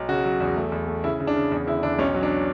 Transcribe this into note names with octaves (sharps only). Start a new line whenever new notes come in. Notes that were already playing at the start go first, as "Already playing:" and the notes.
Already playing: B1
C#3 F#4
F#3
E2
A3
E2
A3
C#3 E4
C#3
D4
C#3
E2
D3 E4
E2 D4
B1 C#4
F#3
D4